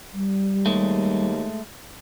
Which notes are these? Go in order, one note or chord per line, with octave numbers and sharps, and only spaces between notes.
G3
D#2 G#3 A3